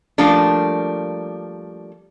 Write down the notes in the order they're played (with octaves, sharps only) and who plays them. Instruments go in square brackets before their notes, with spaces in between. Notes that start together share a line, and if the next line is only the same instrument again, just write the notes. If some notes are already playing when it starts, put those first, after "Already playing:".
[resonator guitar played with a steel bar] F3 G3 A3 A#3 D4